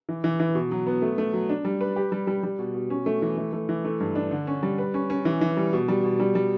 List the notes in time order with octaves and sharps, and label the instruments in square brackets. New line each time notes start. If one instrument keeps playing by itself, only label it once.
[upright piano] E3
E3
E3
B2
F#3
B3
A3
A3
F#3
D4
G3
B4
G4
G3
G3
G3
B2
B2
C#4
A3
E3
A3
A3
E3
A3
G2
D4
D3
C#4
G3
B4
C#4
C#4
E3
E3
G3
B2
G3
B2
G3
G3